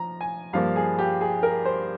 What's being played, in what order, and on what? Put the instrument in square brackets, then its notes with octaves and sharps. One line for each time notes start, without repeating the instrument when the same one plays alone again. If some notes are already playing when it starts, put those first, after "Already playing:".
Already playing: [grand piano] F3 A#5
G#5
G2 F3 A#3 F5
G#4
G4
G#4
A#4
C5